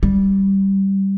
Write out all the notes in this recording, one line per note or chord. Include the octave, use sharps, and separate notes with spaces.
G3